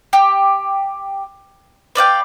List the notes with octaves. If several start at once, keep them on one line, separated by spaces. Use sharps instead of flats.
G4
B4 D5 F5 G5